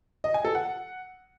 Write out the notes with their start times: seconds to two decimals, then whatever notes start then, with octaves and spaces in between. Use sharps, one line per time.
0.24 D#5
0.34 G#5
0.45 A4
0.55 F#5